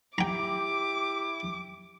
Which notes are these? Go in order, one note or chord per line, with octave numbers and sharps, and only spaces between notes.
E4 G4 G5 A#5 D6